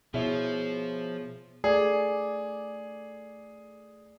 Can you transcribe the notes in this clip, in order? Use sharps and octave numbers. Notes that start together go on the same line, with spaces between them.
B2 F3 E4 G#4 C#5
A3 G#4 D5